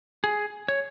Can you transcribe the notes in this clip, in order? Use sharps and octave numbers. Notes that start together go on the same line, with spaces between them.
G#4
C#5